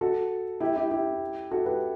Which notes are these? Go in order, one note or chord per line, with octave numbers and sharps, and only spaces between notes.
F#4 A4
E4 G4
E4 G4
E4 G4
F#4 A4
G4 B4